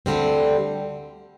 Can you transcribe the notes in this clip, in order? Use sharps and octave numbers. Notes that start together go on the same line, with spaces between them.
D2 D3 G3 C4